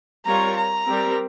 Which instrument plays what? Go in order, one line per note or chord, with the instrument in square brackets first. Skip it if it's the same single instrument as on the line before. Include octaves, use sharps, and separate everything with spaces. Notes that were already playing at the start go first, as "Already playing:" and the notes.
[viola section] G3 C4 F4 A#4 C#5 [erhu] A#5
[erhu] A#5
[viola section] G3 C4 G4 A#4